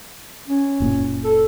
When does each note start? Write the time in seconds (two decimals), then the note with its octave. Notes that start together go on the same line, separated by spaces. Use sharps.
0.48 C#4
0.80 F#1 A#2
1.24 A4